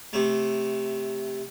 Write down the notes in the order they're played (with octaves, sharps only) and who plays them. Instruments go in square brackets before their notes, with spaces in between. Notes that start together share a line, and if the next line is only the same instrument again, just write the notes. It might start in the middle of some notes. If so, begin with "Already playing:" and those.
[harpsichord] C3 A3